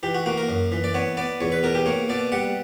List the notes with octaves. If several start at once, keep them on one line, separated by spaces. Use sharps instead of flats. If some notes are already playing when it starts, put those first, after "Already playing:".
E3 G4
F#4
A#3 F#4
A#4
F#2
E3
D5
B3 C#5
B3 D5
E2 C#5
B4
B2 A#4
G4
A#3 C#5
B2 D5
G3 F#5